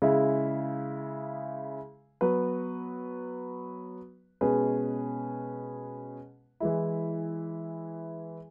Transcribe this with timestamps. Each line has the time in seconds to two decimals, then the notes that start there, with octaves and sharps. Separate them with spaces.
0.02 C#3 G#3 E4
2.21 F#3 B3 F#4 B4
4.41 B2 G#3 C#4 G#4 B4
6.60 E3 G#3 E4